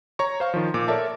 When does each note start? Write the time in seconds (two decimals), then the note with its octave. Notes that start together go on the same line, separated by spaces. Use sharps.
0.19 C#5 A#5 C#6
0.40 C5 F5 C#6
0.54 D#3 F3
0.74 A#2 D6
0.88 A4 A#4 C#5 D5 E5 A5